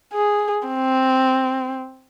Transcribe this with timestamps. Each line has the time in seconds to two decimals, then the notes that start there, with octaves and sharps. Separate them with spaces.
0.13 G#4
0.68 C4